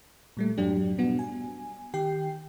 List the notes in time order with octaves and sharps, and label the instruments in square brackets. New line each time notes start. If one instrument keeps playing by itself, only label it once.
[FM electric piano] A#2 G3 A3
F2 G#2 F#3 D4 G4
B2 G3 B3 D4 F#4
G#5
D#3 G4 G5 C7